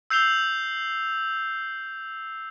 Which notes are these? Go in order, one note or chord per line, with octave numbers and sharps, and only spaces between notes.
E6 G6 C7 F7 G7